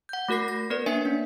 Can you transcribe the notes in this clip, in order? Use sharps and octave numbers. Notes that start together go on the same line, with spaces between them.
F#5 G6
A3 F#4 A#4 A#6 C7
A#6
B3 A#4 B4 D5
A#3 D4 C#5 E5 G#5 C#7
C#4